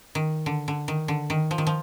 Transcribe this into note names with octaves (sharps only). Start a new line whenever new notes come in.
D#3
D3
D3
D#3
D3
D#3
F3
D#3
F3